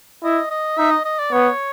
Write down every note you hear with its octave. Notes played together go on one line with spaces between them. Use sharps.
E4 D#5
D#5
D#4 E5
D#5
D#5
D5
B3 C#5